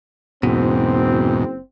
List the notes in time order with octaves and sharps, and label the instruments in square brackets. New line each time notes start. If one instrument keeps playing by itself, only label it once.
[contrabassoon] F#1 [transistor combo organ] E2 G#2 [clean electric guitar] B2 [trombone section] C4